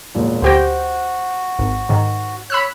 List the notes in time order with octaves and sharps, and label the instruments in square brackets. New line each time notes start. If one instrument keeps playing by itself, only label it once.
[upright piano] E1 A#2
[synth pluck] D2 G4 G5 [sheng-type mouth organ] F#4 [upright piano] C5 A#6
[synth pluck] G#1
G#2 D#3
[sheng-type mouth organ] C#5 [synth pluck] B5 E6 F#6